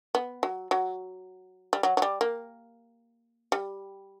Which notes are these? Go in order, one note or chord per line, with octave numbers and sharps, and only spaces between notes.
B3
F#3
F#3
G3
F#3
F#3
G3
A#3
G3